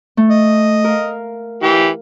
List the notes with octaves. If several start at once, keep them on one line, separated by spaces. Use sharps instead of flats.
A3
D#5
A#4 F5
E3 G4